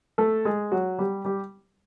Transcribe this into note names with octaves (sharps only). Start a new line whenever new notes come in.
A3 A4
G#3 G#4
F#3 F#4
G3 G4
G3 G4